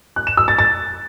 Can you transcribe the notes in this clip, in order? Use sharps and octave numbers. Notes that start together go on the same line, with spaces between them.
F#6
E7
E6
A6
A6